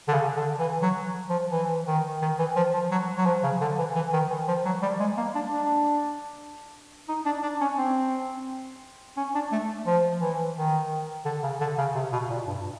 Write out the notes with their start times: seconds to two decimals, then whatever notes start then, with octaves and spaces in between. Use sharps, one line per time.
0.08 D3
0.13 C#3
0.36 D3
0.59 E3
0.82 F#3
1.29 F3
1.52 E3
1.87 D#3
2.22 D#3
2.39 E3
2.56 F3
2.74 F3
2.91 F#3
3.17 F#3
3.26 F3
3.43 C#3
3.61 D3
3.78 E3
3.96 E3
4.13 D#3
4.30 E3
4.48 F3
4.65 F#3
4.82 G3
5.00 G#3
5.17 A#3
5.35 D4
5.52 D4
7.09 D#4
7.25 D4
7.43 D4
7.61 C#4
7.78 C4
9.17 C#4
9.35 D4
9.52 A3
9.87 F3
10.21 E3
10.57 D#3
11.25 D3
11.43 C#3
11.60 D3
11.78 C#3
11.95 C3
12.12 B2
12.30 A#2
12.47 G2